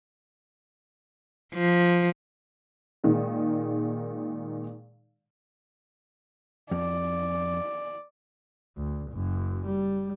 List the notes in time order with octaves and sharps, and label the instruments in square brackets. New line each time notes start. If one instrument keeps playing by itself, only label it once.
[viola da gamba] F3
[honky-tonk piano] A#2 D#3 G#3
[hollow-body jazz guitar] F2 [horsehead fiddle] D5
[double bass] D2
F#1 F#2
G3